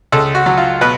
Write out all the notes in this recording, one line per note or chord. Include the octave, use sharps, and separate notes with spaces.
C#2 A4
F#4
F#3
F4
B2 B4